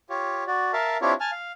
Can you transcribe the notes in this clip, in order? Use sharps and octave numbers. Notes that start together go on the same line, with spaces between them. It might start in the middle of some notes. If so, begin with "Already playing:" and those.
F4 G4 C#5
F#4 D5
A#4 E5 F5 A5
C4 D4 E4 F4 G4 C#5
G#5 A5 F6
F5